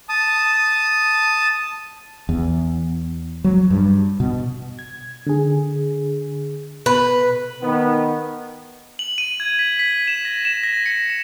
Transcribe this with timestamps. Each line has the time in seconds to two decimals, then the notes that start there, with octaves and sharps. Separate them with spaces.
0.09 A5 D#6
2.29 E2
3.44 F#3
3.70 G2
4.20 B2
4.79 G#6
5.27 D3 G#4
6.86 B2 B4
7.62 D#3 B3
8.99 F#7
9.18 D#7
9.40 G#6
9.59 B6
9.79 B6
10.07 E7
10.25 A#6
10.45 E7
10.63 A#6
10.86 C#7
11.10 E7